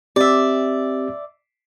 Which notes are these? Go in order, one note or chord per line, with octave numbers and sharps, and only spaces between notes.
C4 G4 D5 E5